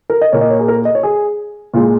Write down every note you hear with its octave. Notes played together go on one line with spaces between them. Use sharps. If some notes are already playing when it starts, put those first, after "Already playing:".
A#4
D#5
A#2 A#3 C#5
D#5
C#5
G#4
A#4
D#5
C#5
G#4
A#2 G#3 F4